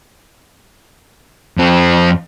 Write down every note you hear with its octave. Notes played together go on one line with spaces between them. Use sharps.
F2 C4